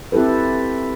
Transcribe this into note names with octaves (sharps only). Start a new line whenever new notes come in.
C4 E4 G4 A4 B4